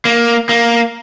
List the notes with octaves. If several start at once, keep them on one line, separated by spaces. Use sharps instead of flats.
A#3
A#3